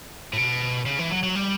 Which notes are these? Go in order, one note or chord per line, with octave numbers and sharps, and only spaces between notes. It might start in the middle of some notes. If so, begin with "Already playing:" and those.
A2
B2
C#3
E3
F#3
F#3
G3